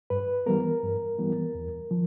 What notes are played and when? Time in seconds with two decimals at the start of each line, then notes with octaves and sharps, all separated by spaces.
0.10 G2 B4
0.46 E3 G3 B3 A#4
0.82 G2
1.18 E3 G3 B3
1.55 E2
1.91 F3